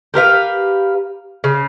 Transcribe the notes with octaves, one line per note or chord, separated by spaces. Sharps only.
G4 A#4 B4 F5
C#3